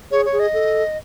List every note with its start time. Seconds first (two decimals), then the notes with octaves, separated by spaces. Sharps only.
0.11 G#4 C#5
0.25 C#5
0.32 G#4
0.39 D#5
0.54 A4